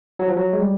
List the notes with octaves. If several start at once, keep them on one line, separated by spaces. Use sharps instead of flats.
F#3
F3
F#3
G#3
G3